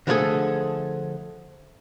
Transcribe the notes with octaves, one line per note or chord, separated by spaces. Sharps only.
D3 F3 A3 C4 G#4 A4